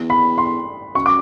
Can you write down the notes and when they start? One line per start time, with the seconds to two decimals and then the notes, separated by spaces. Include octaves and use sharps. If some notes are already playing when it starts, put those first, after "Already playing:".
Already playing: E2
0.10 B5
0.38 C6
0.95 F#2 C#6
1.06 D6